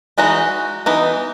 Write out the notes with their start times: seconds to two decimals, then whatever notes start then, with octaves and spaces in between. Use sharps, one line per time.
0.18 E3 G#3 D#4 F#4
0.86 E3 B3 D#4